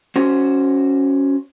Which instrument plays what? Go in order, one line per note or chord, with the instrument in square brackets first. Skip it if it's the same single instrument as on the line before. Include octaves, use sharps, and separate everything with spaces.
[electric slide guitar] C#4 F#4 C5